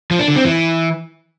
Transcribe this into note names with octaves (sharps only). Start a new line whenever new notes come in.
F3
D4
D3
C4
E3